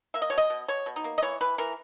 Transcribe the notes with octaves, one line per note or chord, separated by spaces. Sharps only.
A#3 E5
D#5
B2 C#5
D#5
B2
B2 C#5
B2
D#4
A#3
D#5
E3 C#5
E3 B4
E3 A#4